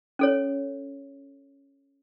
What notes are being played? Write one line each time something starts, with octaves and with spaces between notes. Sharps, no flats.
C#4 A4 C#5